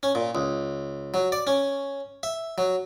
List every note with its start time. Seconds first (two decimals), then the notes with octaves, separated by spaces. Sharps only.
0.03 C#4
0.15 A#2
0.35 C#2
1.14 F#3
1.32 D5
1.47 C#4
2.23 E5
2.58 F#3